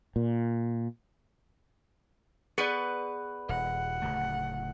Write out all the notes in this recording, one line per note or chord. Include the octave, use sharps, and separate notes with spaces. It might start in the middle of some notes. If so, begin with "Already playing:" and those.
A#2
B3 G#4 B4 D5
D#1 F#5
D1 C#3 A3